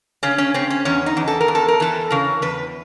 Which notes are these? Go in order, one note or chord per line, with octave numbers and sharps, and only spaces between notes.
C#3 C#4
C#4
C#3 C4
C#4
E2 C#4
D#4
E2
A4
A#4
E2
A4
A#4
E3 A4
C#3 A#4
E2 B4